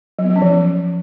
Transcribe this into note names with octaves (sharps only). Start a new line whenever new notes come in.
F#3
B3
F#3
C#4
F3